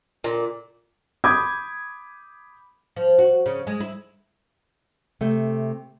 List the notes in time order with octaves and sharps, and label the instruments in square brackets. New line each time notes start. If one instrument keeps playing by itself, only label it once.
[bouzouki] A#2
[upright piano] B5 D6 D#6 G6 G#6
[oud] F3
F#4
C#3
G#3
E4
[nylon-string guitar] C3 A3